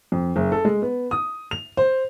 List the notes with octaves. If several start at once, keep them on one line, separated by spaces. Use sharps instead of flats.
F2
F#1
A4
G#3
B3
D#6
F7
C5